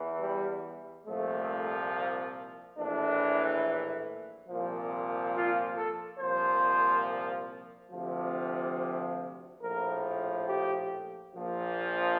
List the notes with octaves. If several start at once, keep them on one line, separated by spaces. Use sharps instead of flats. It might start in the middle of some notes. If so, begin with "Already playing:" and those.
Already playing: E2 E3
G3
C2 A#2 F3 A3
A#1 A2 E3 D4
C2 A#2 F3
F4
A4
C2 A#2 F3 C5
D2 C3 F3
A#1 A2 F3 A#4
G4
A#1 A#2 F3